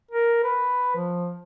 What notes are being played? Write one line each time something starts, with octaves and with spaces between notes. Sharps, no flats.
A#4
B4
F3